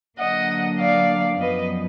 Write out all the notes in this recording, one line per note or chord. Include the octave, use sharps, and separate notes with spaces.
D3 F#3 A#3 D#5 F#5
D5 F5
F#2 F3 B3 B4 D#5